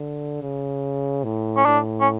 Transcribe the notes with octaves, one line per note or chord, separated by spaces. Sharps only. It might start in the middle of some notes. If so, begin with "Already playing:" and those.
Already playing: D3
C#3
A2
C#4
A2 D4
C#4